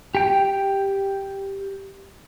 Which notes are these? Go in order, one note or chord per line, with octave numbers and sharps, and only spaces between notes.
G4 G5